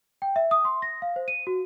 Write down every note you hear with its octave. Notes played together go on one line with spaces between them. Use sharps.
G5
E5
D#6
C6
A#6
F5
C5
D#7
F#4